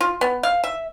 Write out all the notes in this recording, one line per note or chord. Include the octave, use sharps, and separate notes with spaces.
F4
B3
F5
E5